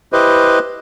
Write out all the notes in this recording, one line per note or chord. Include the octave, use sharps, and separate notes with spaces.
E4 G4 B4 C5 D#5